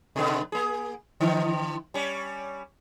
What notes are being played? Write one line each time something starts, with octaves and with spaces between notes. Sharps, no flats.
B2 D3 B3
A#3 G#4
D3 E3
G3 C#4